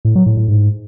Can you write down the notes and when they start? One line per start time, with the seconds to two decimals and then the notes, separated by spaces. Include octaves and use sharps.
0.05 A2
0.15 F#3
0.26 A2
0.37 A2
0.48 G#2